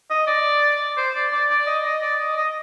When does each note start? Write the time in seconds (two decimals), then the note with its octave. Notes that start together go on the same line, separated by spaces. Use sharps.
0.10 D#5
0.27 D5
0.97 C5
1.15 D5
1.32 D5
1.50 D5
1.67 D#5
1.84 D#5
2.02 D5
2.20 D#5
2.37 D#5